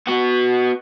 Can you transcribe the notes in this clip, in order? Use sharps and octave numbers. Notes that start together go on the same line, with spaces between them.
B3 F#4